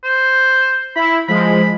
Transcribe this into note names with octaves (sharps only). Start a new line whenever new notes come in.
C5
E4 B5
F3 G#3 B5